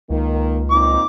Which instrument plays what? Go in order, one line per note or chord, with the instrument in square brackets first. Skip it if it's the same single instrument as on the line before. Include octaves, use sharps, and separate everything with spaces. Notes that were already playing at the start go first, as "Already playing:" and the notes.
[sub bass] C#2 [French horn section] D#3 A#3
[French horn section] A#2 C4 D#4 [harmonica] D6